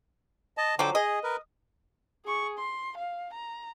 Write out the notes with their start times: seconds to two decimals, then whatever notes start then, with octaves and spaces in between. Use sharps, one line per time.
0.57 D#5 A5
0.79 D3 F3 F#3 G5 D6
0.95 G#4 D#5
1.24 A#4 B4
2.25 G#4 C#6
2.58 C6
2.98 F5
3.33 A#5